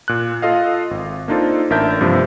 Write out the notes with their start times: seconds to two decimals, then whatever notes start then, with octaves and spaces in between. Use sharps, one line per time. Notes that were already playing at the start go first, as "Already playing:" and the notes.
0.08 A#2 F#6
0.42 F4 A4 D#5 F5
0.91 G#1
1.28 A#3 D4 D#4 F4 A4 C5
1.70 A1 D4 A#4 E5 A5 G6
2.01 G2 C3 F3 A#3